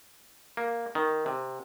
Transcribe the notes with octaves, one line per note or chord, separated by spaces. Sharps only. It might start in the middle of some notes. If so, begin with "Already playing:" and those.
A#3
D#3
C3